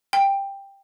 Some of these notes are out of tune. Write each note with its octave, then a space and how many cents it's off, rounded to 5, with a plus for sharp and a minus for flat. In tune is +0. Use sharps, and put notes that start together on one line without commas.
G5 +10